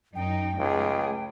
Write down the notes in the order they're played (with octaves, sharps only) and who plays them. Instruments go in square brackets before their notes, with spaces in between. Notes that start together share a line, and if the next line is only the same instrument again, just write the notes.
[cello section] F#2 D#4 [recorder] G5
[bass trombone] C#2 [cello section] A3 G#4